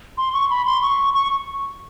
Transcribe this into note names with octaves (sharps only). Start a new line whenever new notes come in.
C6
C#6
B5
C6
C#6
C#6